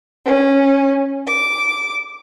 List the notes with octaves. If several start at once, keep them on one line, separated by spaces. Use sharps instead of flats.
C#4
D6